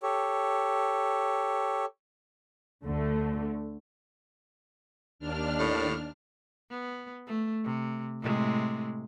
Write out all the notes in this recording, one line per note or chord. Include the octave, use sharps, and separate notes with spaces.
G4 A4 C#5
D2 D3 A3
D#2 D4 F6
A2
B3
A3
C3
A2 C3 G#3